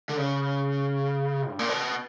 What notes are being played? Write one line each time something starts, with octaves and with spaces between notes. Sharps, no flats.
D3
C#3
G2
A#2
B2